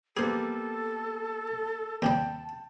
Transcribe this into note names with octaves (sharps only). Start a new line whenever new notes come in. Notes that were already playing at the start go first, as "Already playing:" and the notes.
G3 A#3 B3 G#4 A4 C5
D#2 C3 G3 G5 A5